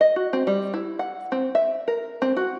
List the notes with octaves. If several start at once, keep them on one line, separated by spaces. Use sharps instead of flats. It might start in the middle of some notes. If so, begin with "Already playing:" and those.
D#5
F#4
C4
G3
E4
F#5
C4
E5
A#4
C4
F#4